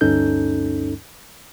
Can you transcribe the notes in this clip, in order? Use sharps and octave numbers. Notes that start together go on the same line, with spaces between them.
D2 G2 C#4 D#4 A4 G6